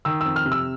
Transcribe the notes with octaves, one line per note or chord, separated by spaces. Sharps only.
D#3 E6
F2 E6
F6
C3
E6